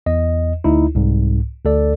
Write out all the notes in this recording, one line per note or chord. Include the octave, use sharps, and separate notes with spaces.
E2 D#5
D2 D#4 E4
C2 G#2
D2 A4 D5